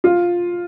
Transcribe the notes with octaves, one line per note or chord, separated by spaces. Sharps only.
F4